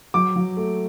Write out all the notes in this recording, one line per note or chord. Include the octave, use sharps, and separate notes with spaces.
F#3 D6
F#3
A3